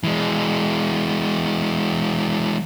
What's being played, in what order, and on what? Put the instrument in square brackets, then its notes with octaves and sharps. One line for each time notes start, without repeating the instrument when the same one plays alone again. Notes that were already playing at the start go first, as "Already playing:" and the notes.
[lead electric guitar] E3 G#3